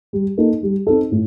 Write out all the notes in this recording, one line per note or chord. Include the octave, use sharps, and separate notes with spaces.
G3
A#3 D#4 A4
G3
C4 D#4 A4
A2